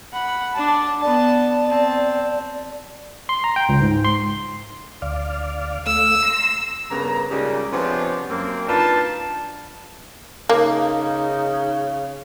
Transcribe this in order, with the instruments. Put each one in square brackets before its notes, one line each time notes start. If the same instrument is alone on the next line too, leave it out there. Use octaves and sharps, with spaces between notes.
[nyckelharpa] F#5 B5
D4 A5
[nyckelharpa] B3 A5 [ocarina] D5
[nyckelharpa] C4 A5
[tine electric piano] C6
A#5
G5
C#2
G#2
C6
[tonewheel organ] D2 D5 F5
[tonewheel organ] A3 F5 [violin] E6
[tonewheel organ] A#5 C6
[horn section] G2 C#3 A#3 B3 A#5
A#2 C#3 G3 G#3 A#3 D#4
C3 F3 B3 C#4 D4
F#2 A#3 C4
D4 D#4 F4 B4 A5
[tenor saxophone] C#3 [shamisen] A#3 [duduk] D#4